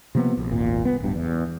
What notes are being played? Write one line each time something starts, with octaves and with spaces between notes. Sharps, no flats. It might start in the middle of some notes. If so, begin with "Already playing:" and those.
C3 F3 A#3 B3
A#1
D#1 G#1 A#2
C2 B3
D1 G2
E2